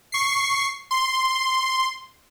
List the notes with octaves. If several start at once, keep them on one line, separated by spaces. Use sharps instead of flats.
C#6 C7
C6